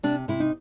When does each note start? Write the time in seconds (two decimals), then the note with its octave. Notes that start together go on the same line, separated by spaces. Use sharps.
0.03 C3 D4
0.28 C3 E4
0.40 D#4